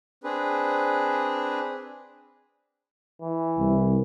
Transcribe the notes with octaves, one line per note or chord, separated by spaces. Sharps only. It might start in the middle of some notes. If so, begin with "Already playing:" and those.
C4 D4 G#4 B4
E3
C2